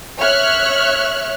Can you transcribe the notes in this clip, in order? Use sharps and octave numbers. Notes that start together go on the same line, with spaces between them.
C#5 E5 F6 F#6